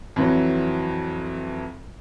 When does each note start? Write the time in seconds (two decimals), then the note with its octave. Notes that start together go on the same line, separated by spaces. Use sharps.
0.16 F2 E3 F#3